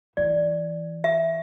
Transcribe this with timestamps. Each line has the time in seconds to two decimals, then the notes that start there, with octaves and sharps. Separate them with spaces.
0.17 E3 D5
1.04 E5